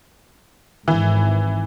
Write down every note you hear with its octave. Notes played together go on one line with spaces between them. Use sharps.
G#1 E3